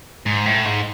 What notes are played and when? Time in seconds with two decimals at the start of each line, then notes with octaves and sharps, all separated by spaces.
0.26 G#2
0.46 A2
0.65 G#2